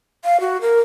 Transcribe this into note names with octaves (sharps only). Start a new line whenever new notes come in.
F5
F#4
A#4